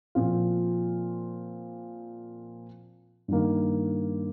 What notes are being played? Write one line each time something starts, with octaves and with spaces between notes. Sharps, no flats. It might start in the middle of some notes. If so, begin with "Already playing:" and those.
A#2 F3 C4 F4
G2 D#3 A#3